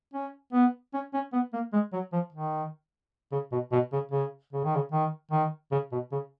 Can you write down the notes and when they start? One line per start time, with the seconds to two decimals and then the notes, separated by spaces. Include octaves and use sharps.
0.13 C#4
0.52 B3
0.93 C#4
1.13 C#4
1.33 B3
1.53 A#3
1.73 G#3
1.93 F#3
2.13 F3
2.32 D#3
3.32 C#3
3.52 B2
3.72 B2
3.92 C#3
4.11 C#3
4.52 C#3
4.64 D#3
4.75 C#3
4.92 D#3
5.31 D#3
5.71 C#3
5.92 B2
6.12 C#3